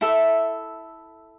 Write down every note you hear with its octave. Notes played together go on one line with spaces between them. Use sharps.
E4 A4 E5